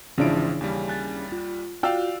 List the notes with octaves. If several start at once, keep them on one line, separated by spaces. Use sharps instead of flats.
G#1 C#3 E3 F3 D4 E4 D7
D#2 G3 G#5
G#5 F#6 A6
F4
F4 F#4 D5 F5 G5 E6